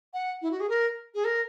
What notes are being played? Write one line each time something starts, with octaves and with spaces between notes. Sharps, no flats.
F#5
E4
F#4
G#4
A#4
G#4
A#4